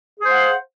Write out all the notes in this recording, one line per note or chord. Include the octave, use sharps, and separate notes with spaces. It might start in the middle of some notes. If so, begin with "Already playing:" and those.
G#4 C5 F5 F#5